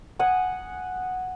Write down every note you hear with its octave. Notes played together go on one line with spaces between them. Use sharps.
F#5 G#5 D#6